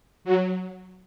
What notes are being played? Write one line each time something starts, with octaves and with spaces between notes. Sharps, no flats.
F#3